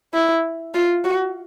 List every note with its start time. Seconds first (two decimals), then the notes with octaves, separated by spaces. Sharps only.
0.14 E4
0.74 F4
1.04 F#4